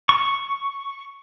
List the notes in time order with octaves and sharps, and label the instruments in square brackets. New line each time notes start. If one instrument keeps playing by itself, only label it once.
[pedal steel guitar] C#6